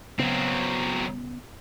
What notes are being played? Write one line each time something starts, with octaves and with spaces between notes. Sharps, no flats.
C#3 F#3 B3 C4